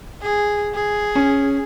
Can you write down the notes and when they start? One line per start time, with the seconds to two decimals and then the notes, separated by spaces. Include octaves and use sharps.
0.23 G#4
0.74 G#4
1.15 C#4